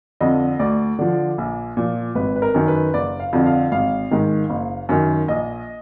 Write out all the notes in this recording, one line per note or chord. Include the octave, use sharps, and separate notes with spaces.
F2 D3 D#5
D2 D5
D3 F3
A#1
A#2 F3
G#1 B4
B4
A#4
F#2 D#3
B4
F#1 D5
F5
F2 D3 F3
F5
G#1 F5
G#2 D#3
F#1
F#2 D#3
A#1 D#5